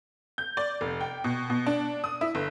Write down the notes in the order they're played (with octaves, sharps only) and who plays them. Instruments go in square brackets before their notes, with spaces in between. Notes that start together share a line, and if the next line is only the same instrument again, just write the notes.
[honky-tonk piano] G6
D5
F1
G5
B2
B2
D4
D#6
E4
G1